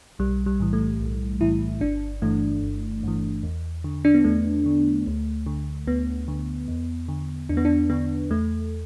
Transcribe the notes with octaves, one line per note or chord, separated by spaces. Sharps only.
B1 G3
G3
A2 E3
A3
B1
A2 E3 E4
G1 D4
G2 E3 A3
G1
G2 E3
E2
D3
D4
B3
E2 A3
D3
D2
D3
D2 B3
D3
E2
D3
E2 D4
B3
D4
D3 B3
E2 A3